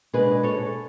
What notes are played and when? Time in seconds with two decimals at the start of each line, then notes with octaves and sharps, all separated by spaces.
0.13 B2 G#3 D4 G#4 B4
0.43 A4 C#5